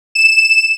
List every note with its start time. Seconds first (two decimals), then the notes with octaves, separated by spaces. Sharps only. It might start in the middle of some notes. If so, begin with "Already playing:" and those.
0.15 E7